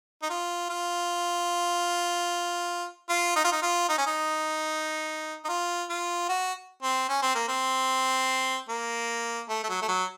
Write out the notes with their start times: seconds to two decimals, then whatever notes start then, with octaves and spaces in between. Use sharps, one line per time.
0.22 D#4
0.30 F4
0.69 F4
3.09 F4
3.36 D#4
3.44 F4
3.52 D#4
3.62 F4
3.89 D#4
3.98 C#4
4.06 D#4
5.45 D#4
5.48 F4
5.89 F4
6.29 F#4
6.82 C4
7.09 C#4
7.22 C4
7.35 A#3
7.48 C4
8.69 A#3
9.49 A3
9.63 A3
9.69 F#3
9.82 A3
9.88 F#3